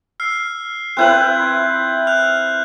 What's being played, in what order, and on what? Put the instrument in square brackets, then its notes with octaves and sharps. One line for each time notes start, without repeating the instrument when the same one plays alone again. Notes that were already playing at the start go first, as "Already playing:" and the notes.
[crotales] E6 F6 C7
[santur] C4 E4 B4 [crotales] F#6 G6 F#7
[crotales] F6 F#6 F7